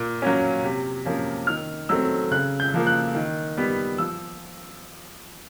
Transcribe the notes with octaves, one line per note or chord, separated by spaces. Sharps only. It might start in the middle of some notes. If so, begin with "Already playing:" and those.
Already playing: A#2
F#3 A#3 C#4
C3
F3 A#3 C#4
D#3 F6
F#3 A3 C4 E6
C#3 F#6
G6
F3 A#3
F#6
D#3
G3 B3
F3 E6